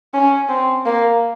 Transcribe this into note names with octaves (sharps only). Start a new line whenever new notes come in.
C#4
C4
A#3